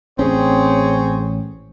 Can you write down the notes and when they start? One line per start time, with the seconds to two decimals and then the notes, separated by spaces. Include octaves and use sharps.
0.19 A1 C4 C#4 G#4 C#5